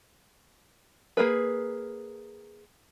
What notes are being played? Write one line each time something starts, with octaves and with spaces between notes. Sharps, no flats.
A#3 G#4 A#4 B4